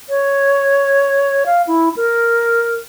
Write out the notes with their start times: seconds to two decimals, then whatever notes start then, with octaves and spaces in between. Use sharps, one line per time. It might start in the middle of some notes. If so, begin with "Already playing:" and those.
0.09 C#5
1.46 F5
1.67 E4
1.97 A#4